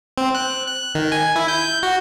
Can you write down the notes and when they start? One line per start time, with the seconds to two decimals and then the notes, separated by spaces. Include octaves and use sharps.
0.18 C4
0.35 F#6
0.67 F#6
0.95 D#3
1.12 G#5
1.36 E4
1.48 G6
1.83 F#4